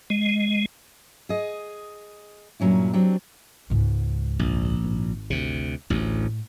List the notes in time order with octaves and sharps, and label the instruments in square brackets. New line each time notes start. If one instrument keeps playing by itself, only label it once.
[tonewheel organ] G#3
[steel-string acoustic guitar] G#4 D#5
G2 A#2 F#3 C#4 E4
F#3 C4 D4 G4
[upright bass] C#2 G#2
[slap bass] A#1
[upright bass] G#1
[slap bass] D2 C3
[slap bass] A1 D2 [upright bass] A2